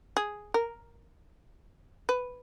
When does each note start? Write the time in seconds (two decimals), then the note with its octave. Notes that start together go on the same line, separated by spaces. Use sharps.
0.17 G#4
0.54 A#4
2.09 B4